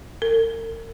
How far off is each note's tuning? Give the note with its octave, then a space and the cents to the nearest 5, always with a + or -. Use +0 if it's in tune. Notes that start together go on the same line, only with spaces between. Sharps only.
A#4 -45